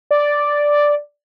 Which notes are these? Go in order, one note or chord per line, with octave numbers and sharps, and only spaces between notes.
D5